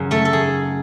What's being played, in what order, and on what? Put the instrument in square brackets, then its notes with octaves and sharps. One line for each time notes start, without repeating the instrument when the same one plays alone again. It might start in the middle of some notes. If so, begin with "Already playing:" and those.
Already playing: [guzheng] F#2 C#3
A3 A4
A4
G#4